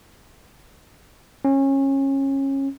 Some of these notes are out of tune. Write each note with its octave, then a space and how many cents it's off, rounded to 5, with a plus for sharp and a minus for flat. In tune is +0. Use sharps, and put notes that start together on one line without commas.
C#4 -25